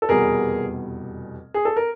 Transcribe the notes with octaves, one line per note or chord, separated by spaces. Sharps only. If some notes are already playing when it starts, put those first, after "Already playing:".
A4
F1 E2 B2 G3 G#4 A#4
G#4
A4
A#4